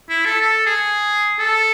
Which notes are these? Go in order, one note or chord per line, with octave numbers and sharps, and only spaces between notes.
E4
A4
A4
G#4
A4